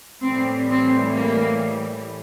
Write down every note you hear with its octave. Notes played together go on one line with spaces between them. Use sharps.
A2 E3 G3 C4
C4
A#3